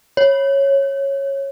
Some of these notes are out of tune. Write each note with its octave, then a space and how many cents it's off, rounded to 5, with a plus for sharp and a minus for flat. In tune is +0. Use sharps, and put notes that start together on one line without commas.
C#5 -10